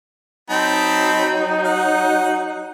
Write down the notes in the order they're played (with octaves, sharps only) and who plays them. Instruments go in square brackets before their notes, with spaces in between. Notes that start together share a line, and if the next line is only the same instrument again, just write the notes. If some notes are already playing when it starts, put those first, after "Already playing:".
[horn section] F#3 D#4 [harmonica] C4 A5 B5
[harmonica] F#5